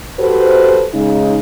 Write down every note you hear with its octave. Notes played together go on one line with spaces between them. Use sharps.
F#4 G4 A4 B4 C5
C#3 G#3 D#4